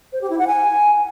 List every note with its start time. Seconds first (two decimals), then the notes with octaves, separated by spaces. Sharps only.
0.13 C5
0.21 G4
0.30 E4
0.39 F#5
0.47 G#5